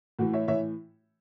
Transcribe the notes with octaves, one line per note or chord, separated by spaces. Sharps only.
A2 E3 F#4
C#5 E5
A2 E3 C#5 E5